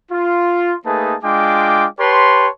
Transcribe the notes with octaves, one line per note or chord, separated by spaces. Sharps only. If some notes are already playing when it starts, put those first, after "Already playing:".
F4
A3 A#3 D#4 G#4 B4 A5
G#3 D4 F4 G5 D6
G4 B4 C#5 A5 C6